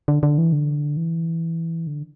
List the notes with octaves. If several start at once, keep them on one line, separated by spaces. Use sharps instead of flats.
D3
D3
E3
D3
E3
D3